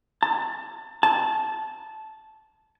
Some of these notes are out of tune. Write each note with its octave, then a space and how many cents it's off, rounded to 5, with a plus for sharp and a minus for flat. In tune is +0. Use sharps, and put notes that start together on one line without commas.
A5 +25
A5 -10